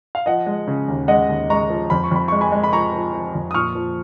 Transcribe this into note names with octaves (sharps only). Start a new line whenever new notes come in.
F5
F3 D#5 F#5
G#3
C#3
D#2
G#3 D#5 F#5
D#2
G#3 A#5 C#6
F3
F2 B5
C#6
F2 B5
G#3 C#6
G#5 B5
G#3
B5
F3 A#5 C#6
F3
F3
F2
D#6
A#2 C#6 F6
F3